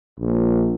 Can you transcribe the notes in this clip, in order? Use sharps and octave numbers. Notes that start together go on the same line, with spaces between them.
A#1